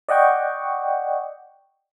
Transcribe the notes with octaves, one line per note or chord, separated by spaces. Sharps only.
D5 D#5 F#5 G5 C#6